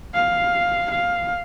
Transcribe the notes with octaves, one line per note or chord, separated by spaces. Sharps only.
F5
F5